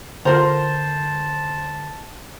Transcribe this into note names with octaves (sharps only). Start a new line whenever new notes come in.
D3 F4 A#4 C5 A5 A#5